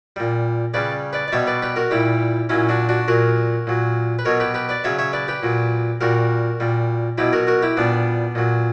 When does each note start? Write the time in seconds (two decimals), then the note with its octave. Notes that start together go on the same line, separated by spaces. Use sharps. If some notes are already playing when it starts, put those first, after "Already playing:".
0.16 A#2 G3
0.74 C#3 G3 B4 D5
1.13 B4 D5
1.28 D5
1.32 B2 G3 C#5 E5
1.47 B4 D5
1.62 G4 B4
1.76 F#4 A#4
1.91 A#2 G3 E4 G4
2.49 A#2 F#3 C#4 E4
2.69 D4 F#4
2.89 D4 F#4
3.08 A#2 F#3 F#4 A#4
3.67 A#2 F#3
4.19 B4
4.25 B2 F#3 A#4 C#5
4.40 G4 B4
4.54 G4 B4
4.69 B4 D5
4.84 C#3 F#3 C#5 E5
4.98 C#5 E5
5.13 B4 D5
5.28 G4 B4
5.43 A#2 F#3
6.01 A#2 G3 F#4 A#4
6.60 A#2 G3
7.18 B2 F#3 E4 G4
7.33 F#4 A#4
7.47 F#4 A#4
7.62 E4 G4
7.77 A#2 G3 B3 D4
8.35 A#2 F#3